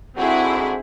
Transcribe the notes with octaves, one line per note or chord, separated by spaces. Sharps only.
G#2 D3 C4 E4 F#4 G#4